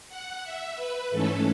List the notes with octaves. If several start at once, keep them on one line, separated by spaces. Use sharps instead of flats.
F#5
E5
B4
G#2 E3 A3 C#4 A4